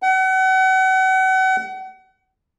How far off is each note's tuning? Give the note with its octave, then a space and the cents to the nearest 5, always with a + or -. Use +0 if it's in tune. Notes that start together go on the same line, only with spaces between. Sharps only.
F#5 +35